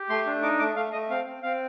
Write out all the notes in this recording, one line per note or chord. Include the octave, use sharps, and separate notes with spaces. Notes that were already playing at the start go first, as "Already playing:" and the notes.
Already playing: G4
A3 C6
D4
D#4 D6
A3 D6
A3 F5
A3 D#5
C4 F5
C4
C4 F5